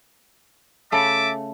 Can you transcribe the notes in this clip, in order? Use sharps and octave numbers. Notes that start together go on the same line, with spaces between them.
C#3 A3 A4 E5 A5 D6